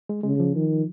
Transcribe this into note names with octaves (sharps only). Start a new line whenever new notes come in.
G#3
C#3 G#3
F3
D#3